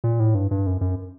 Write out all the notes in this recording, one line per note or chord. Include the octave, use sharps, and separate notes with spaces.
A#2
A2
G2
G2
F#2
F#2